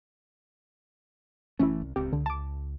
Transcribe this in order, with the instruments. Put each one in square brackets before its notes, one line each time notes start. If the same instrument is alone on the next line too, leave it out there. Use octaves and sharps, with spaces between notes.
[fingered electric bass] F#1 E3 A3 [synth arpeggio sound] C#4 E4
[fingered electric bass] C2
[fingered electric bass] D1 C#2 C4 [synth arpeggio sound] G4
[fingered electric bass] C#2 [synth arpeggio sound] D3
[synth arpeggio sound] A5 D6